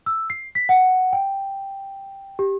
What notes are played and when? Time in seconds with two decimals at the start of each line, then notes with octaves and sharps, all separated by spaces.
0.06 E6
0.30 C7
0.55 B6
0.69 F#5
1.13 G5
2.39 G4